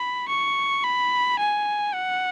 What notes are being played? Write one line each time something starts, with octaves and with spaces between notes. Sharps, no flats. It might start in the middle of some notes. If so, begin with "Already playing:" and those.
Already playing: B5
C#6
B5
G#5
F#5